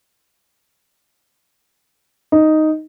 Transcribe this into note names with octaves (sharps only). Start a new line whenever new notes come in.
D#4